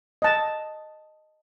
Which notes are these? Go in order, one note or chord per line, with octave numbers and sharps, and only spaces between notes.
D#5 A5